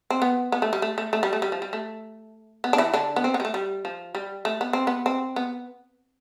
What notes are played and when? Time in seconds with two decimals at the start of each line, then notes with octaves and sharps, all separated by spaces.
0.10 C4
0.22 B3
0.52 B3
0.62 A3
0.73 G3
0.82 A3
0.98 A3
1.13 A3
1.23 G3
1.33 A3
1.42 G3
1.52 F3
1.62 G3
1.73 A3
2.64 B3
2.73 D4
2.78 E3 E4
2.94 D3 D4
3.16 B3
3.24 C4
3.34 B3
3.40 G3
3.45 A3
3.54 G3
3.85 F3
4.15 G3
4.45 A3
4.61 B3
4.73 C4
4.87 B3
5.06 C4
5.36 B3